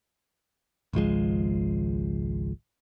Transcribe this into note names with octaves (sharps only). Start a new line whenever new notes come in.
G#1 C#2 F3 G#3